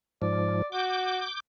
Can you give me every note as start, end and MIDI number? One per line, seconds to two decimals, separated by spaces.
0.22 0.62 44
0.22 0.62 53
0.22 0.66 74
0.72 1.23 66
0.72 1.40 86
0.72 1.40 91